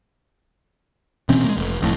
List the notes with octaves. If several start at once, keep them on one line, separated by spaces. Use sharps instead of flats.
B2 E3 C4 C#4
G#3 A#3
F1
F#1 F2 A2